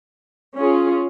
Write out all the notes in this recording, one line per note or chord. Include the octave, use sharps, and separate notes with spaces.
C#4 F4 G#4